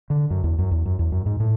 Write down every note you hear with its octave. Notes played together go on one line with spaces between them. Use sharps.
D3
F#2
E2
F#2
E2
F#2
E2
F#2
G#2
A2